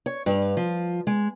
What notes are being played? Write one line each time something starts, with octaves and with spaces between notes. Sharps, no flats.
C#5
G2
F3
G#3